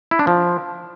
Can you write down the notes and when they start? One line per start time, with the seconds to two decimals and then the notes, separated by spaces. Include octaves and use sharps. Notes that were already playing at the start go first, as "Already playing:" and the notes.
0.11 E4
0.19 D4
0.27 F3